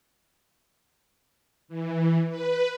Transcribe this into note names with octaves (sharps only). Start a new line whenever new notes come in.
E3
B4